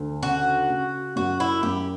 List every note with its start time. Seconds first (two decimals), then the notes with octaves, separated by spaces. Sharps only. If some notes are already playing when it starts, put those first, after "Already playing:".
Already playing: D2
0.22 C#3 F#4
0.69 C#3
1.16 F#2 F#4
1.40 E4
1.63 F#2 G4